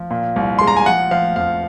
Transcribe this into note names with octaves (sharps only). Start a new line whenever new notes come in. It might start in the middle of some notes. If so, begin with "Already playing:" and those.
Already playing: F3
A#2
C2
G#3 C6
A#5
G#5
F3 F#5
F3 F5
F2 F5